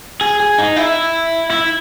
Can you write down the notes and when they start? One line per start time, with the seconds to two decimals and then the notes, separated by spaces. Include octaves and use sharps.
0.21 G#4
0.40 G#4
0.58 D#4
0.76 E4
1.50 E4